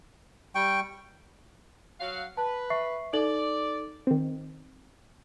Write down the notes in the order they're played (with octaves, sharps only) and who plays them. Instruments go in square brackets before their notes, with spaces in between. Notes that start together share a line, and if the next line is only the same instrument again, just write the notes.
[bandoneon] G3 C#6 [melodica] G5
[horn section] F#3 F5 F#5
[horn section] B4 [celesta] A5
[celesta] E5 C#6 C7
[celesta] D#4 A4 F#7 [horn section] D5
[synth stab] D#3 C4